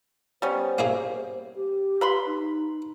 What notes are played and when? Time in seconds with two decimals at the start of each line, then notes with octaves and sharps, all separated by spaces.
0.42 G3 B3 C#4 C5
0.78 A#3 E4 G#4
1.55 G4
2.01 B4 B5 C6
2.26 D#4